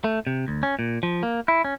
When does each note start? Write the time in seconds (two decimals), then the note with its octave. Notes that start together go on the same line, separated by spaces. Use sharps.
0.04 A3
0.27 C3
0.48 D2
0.63 C#4
0.79 A#2
1.03 F3
1.23 A#3
1.48 E4
1.64 C#4